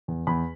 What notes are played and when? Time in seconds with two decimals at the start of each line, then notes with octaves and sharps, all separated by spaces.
0.08 E2
0.27 E2 B5